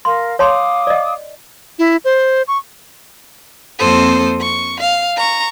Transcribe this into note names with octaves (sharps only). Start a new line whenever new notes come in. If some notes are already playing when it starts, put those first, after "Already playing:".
A#4 F5 C6
C#5 F5 A5 C6 D6 D#6
D5 D#5
E4
C5
C#6
F2 A#3 C4 A4 C5 D#6
C#6
F5
A#5 C#6